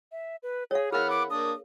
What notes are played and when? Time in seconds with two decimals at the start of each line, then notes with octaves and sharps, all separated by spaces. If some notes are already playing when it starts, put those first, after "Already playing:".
0.12 E5
0.43 B4
0.71 G#4 C#5 F5
0.92 E3 G#4 A#4 F5 F#5 B5 F6
1.10 D6
1.30 A#3 D4 D#6